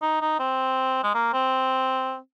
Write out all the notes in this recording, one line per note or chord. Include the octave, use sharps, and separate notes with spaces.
D#4
D#4
C4
G#3
A#3
C4